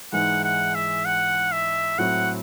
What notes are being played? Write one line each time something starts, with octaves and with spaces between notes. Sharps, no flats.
G#2 E3 G#3 F#5
F#5
E5
F#5
E5
A2 F#3 A3 C4 F#5